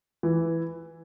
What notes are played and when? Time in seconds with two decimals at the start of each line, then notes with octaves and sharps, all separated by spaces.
0.23 E3